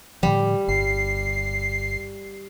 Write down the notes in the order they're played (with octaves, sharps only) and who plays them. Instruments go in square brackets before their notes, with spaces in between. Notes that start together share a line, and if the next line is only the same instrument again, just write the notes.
[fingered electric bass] A2 D3 F3 [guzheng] G3
[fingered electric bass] G1 [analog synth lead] C7